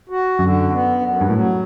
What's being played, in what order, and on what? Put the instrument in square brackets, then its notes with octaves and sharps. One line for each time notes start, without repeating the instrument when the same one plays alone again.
[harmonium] F#4
[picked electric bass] F#2 [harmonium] D3
[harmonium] B3
F#2
[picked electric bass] G2
[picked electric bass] A2 [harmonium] F#3